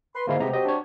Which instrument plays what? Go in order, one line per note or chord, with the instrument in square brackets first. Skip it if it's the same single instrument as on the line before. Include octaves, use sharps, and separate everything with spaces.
[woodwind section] B4 C6
[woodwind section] G#2 D3 [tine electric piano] A#3 E4 F5
[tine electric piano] C3 G#3 A#5 [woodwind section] B3 C4 G4
[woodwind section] F#3 C4 G4 [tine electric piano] D#5
[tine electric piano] D4 C#5